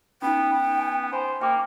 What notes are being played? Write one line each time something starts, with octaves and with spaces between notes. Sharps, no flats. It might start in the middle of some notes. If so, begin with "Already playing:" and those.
B3 C#4 D#4 G5
B3
G#5
C5 G#5 B5
A#3 G5 D6 D#6